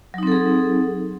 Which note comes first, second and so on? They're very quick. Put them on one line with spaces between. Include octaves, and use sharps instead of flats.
F#3 D#4 C4 A4 G#4